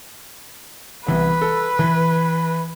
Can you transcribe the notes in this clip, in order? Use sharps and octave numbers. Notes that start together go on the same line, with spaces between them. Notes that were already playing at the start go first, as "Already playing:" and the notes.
C2 E3 B3 B4
A4
E3